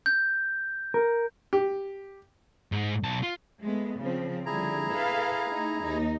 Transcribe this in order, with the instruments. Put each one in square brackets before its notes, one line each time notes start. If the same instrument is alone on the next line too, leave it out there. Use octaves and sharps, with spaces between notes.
[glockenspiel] G6
[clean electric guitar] A#4
[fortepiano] G4
[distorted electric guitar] G#2
B1 A5
F4
[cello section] G#3 A3 B3
C#3 F3 C4
[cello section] D3 F3 G3 [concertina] E4 G#4 A#5
[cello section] A4 B4 F5
A3 D#4
D#2 D#4